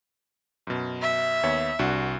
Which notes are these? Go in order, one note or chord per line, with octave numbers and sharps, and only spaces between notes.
F#2 B2
E5
D#2 B3 C#5
C2 D4 F#4